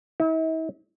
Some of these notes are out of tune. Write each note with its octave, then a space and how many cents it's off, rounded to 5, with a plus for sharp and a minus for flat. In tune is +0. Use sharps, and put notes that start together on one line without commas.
E4 -45